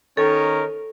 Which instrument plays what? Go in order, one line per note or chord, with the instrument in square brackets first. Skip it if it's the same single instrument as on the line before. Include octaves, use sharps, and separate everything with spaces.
[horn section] D#3 C#4 A#4 [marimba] A4